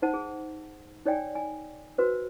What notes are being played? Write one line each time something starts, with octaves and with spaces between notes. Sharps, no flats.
D#4 C5 F#5 A5
G#4
D#4 C#5 D5 G5 G#5
G#5
F#4 B4 C5